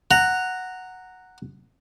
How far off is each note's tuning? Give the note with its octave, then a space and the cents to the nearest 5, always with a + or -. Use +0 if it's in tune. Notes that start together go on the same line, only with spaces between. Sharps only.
F#5 +0 A#5 -10